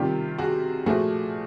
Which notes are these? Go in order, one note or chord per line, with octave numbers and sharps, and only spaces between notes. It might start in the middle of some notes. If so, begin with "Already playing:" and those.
Already playing: C3 D#3 G3 F4 G4
F#4 G#4
A#2 F3 A3 F#4 G#4